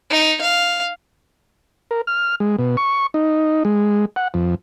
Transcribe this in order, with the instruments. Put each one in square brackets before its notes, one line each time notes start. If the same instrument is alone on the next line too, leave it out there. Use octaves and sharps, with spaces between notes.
[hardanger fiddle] D#4
F5
[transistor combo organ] A#4
F6
G#3
B2
C#6
D#4
G#3
F#5
F2